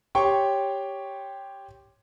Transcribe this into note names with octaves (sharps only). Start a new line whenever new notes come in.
G4 C#5 G5 C6 C#6